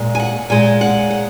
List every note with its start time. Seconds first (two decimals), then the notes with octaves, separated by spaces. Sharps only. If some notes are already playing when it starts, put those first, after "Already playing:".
Already playing: A#2 G#3
0.15 G#5
0.20 F#5
0.50 A#2 G#3 G#5
0.81 F#5
1.10 F#5